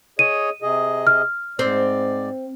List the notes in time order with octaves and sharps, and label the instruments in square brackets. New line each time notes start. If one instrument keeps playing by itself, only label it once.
[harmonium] G#4 C#5 D#5 [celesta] D#7
[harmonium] C3 G#4 D#5
[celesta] F6
[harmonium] G#2 D5 [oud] C4